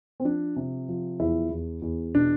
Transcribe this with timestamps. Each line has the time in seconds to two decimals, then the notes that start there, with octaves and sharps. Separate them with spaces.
0.20 C4
0.24 F3 D4
0.56 C3
0.88 F3
1.19 E2 E4
1.51 E2
1.82 E2
2.15 B2 D4